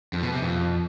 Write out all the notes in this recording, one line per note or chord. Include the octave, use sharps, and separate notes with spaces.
F2
B2
C3
F2